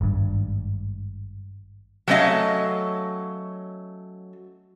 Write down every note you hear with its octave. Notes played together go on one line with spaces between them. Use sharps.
G#1 G2
F#3 A3 B3 C#4 D#5 F5